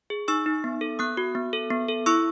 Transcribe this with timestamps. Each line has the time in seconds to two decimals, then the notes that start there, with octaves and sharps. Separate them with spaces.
0.10 G#4
0.28 D#4 C#6 E6
0.46 D#4
0.64 B3
0.81 A4
0.99 B3 D#6 F#6
1.17 F#4
1.35 B3
1.53 A4
1.70 B3
1.88 A4
2.06 E4 C#6 E6